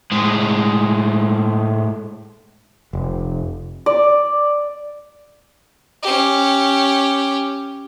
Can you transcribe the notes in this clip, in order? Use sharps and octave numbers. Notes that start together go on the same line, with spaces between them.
A2 G#3
F1
D5
C#4 G4